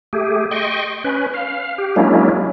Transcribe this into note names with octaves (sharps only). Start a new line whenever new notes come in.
A3 G4 G#4
D#5 G5 C6 C#6
C#4 B4
F5
G4
F#3 G#3 A#3 C#4 D4 E4